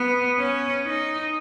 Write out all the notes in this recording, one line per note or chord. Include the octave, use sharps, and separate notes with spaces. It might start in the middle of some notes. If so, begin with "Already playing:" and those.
Already playing: B3
C#4
D#4